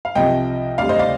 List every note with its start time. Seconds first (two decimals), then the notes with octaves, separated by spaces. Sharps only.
0.05 F5
0.15 C2 C3 F3 C4 D#5 G5
0.78 D2 C3 G3 D5 F5
0.89 C5 D#5
0.99 D5 F5